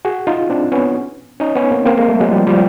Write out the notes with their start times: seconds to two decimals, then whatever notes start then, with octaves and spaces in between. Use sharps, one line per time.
0.05 F#4 G#4
0.27 D#4 F4
0.50 C4 D4
0.72 B3 C#4
1.40 C#4 D#4
1.55 B3 C#4
1.71 A#3 C4
1.86 A#3 C4
1.97 G#3 A#3
2.08 G3 A3
2.20 F#3 G#3
2.32 F3 G3
2.47 F3 G3